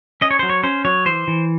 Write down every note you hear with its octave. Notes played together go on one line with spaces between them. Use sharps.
C#4 D#5
C#5
F#3 C5
C#5
C#4 C5
F#3 C#5
E3 C5
E3